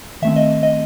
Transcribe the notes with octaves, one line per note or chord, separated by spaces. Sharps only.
D#3 A3 C4 E5
D#5
D#5